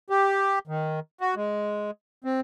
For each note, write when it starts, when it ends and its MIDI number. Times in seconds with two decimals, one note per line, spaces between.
0.10 0.59 67
0.68 1.00 51
1.21 1.35 66
1.36 1.91 56
2.24 2.41 60